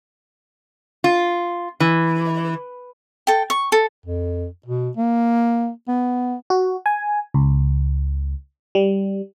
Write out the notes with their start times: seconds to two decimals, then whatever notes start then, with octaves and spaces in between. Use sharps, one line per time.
1.04 F4
1.80 E3
3.27 A4 G5
3.50 C#6
3.72 A4
4.06 F2
4.66 B2
4.97 A#3
5.88 B3
6.50 F#4
6.86 G#5
7.34 C#2
8.75 G3